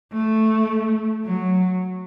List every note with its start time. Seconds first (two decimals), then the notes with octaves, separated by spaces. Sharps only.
0.13 A3
1.25 F#3